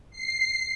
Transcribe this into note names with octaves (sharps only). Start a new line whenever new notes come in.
C7